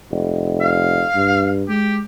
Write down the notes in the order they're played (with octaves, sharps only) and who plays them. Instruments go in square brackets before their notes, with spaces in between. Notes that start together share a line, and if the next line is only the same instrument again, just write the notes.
[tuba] F1
[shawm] F5
[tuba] G2
[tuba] G#3 [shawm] G4